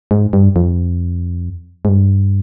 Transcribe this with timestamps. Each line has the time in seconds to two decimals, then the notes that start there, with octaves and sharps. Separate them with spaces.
0.11 G#2
0.33 G2
0.56 F2
1.85 G#2
1.89 G2